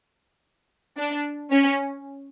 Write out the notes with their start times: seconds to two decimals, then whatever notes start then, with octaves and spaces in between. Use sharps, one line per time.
0.98 D4
1.51 C#4